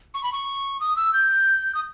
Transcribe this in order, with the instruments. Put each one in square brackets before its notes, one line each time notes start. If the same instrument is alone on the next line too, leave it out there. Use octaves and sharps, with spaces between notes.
[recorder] C#6
B5
C#6
D#6
E6
G6
D#6